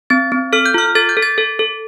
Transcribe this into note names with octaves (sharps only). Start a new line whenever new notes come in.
C4 A6
C4
A4 F6
G6
F4 F6
A4 A6
G6
A4
A6
A4
A4